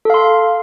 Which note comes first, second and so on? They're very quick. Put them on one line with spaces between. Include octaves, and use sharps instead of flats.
A4 F5 C6